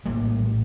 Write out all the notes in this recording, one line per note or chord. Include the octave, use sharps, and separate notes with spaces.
A#1 A2 G3 A#3